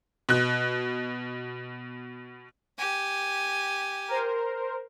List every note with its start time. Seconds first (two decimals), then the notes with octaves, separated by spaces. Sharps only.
0.29 B2 F#6
2.78 G4 G#5
4.08 A#4 C5